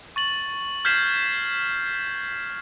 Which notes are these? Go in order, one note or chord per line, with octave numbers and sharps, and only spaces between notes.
C#6 A6 F#7
F6 G6 G#6 B6 C7 E7